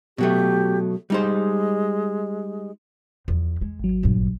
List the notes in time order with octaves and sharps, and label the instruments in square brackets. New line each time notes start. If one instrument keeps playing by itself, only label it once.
[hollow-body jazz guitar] B2 F#3 A3 [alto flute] G4
[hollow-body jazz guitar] G3 D#4 C5 [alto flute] G#3
[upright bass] E2 F3
G#3
[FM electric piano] G#1 F#3
[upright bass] A#1 G2